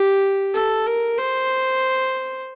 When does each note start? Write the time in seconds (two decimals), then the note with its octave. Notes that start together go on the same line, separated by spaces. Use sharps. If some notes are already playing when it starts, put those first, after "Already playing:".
Already playing: G4
0.54 A4
0.87 A#4
1.18 C5